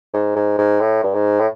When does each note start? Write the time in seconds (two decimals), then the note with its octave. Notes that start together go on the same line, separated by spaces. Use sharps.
0.14 G#2
0.36 G#2
0.58 G#2
0.81 A2
1.03 G2
1.14 G#2
1.40 A2